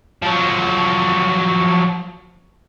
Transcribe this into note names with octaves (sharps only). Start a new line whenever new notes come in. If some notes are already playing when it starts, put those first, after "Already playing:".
F3 F#3